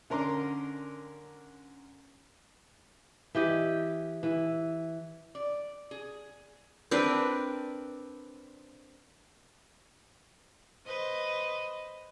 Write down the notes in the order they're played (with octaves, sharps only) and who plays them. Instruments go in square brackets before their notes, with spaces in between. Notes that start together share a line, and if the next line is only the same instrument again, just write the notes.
[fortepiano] D3 C#4 A#4 A#5 C6 D6
[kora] E3 G4 D#5
E3
[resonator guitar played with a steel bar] D5
G#4
[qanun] C4 D4 A#4 B4
[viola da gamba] B4 C5 D#5